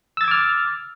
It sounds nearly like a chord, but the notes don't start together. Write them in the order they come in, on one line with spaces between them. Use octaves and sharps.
E6 A6 G#6 D6 F6